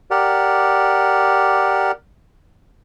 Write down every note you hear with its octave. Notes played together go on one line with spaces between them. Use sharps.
G4 A#4 D5 F#5